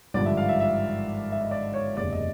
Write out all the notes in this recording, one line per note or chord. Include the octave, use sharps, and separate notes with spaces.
G#1 G2 D3 F3 D5
E5
F5
E5
E5
E5
D#5
D5
C#5
F#1 E2 C3 D5
D#5